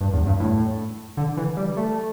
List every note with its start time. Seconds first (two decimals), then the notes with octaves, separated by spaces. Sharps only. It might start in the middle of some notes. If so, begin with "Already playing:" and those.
0.01 G2
0.13 E2
0.26 G2
0.40 A2
1.17 D3
1.37 E3
1.57 G3
1.77 A3